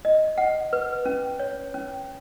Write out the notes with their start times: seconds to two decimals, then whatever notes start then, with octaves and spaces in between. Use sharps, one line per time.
0.05 D#5
0.38 F#5
0.73 B4
1.05 C#4
1.39 C#5
1.74 C#4